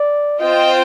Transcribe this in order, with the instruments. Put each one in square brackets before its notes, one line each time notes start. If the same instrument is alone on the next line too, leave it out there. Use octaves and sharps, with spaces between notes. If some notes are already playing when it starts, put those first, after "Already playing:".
Already playing: [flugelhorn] D5
[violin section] C4 F4 C5 G5 [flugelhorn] D#5